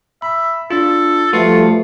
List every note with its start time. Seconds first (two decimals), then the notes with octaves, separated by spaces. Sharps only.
0.22 E5 B5
0.70 D4 F4 A4
1.33 F3 G3 A3 F4 F#4 B4 C#7